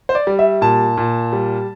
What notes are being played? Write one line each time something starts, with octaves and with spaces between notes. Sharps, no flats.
C5
D5
G3
E5
A#2 A5
A#2
G3